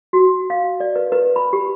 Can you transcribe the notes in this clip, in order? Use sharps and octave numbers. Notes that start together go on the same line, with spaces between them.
F#4
F5
D5
B4
B4
B5
G4